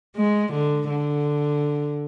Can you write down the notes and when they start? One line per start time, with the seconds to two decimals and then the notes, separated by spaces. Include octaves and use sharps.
0.16 G#3
0.53 D3
0.89 D3